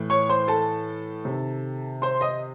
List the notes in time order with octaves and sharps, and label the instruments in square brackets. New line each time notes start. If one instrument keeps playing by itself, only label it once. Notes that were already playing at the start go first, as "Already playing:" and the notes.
Already playing: [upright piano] A2 E3
C#5 C#6
C5 C6
A4 A5
C3 D#3
C5 C6
D#5 D#6